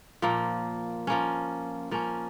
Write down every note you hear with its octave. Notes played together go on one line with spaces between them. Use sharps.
A#2 F3 A#3
F3 A#3 C#4
F3 A#3 C#4